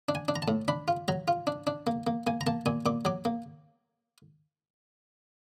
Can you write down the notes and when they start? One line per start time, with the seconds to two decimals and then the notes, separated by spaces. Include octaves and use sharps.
0.09 D4
0.15 G#5
0.28 D4
0.36 A#5
0.42 A5
0.48 A2
0.68 D4 B5
0.88 F4
1.08 F#3 A#5
1.28 F4
1.47 D4
1.67 D4
1.87 A#3
2.07 A#3
2.27 A#3 G#5
2.41 A#5
2.47 A#3 A5
2.66 A#2 G#5
2.86 A#2 D6
3.05 F#3 D6
3.25 A#3